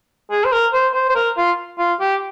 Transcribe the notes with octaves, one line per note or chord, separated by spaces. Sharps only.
G#4
C5
A#4
C5
C5
C5
A#4
F4
F4
G4